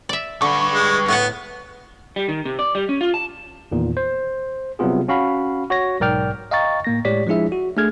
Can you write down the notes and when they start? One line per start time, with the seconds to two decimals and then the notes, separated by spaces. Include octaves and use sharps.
0.09 D5 E5
0.42 D3 G3 B4 C#6
0.72 G#3
1.08 A2 B3 F#5
2.16 G3
2.29 D#3
2.45 C3
2.59 D5
2.75 G3
2.89 C#4
3.01 F4
3.14 A5
3.72 E2 A#2 D#3
3.97 C5
4.79 C3 F#3 G3 B3 F4 G#4
5.08 C#4 F#4 F5 B5
5.70 F#4 C#5 A#6
6.00 B1 G#2 A#4 D5 G5 F6
6.51 D#5 F5 G5 A#5 C#6 A6
6.84 A2 A#3 A#6
7.05 A2 G#3 G4 C#5 D5 B6
7.27 F3 G#3 D4 E4 G#4 E5
7.52 F#4
7.77 A3 D4 G#4 F6 G#6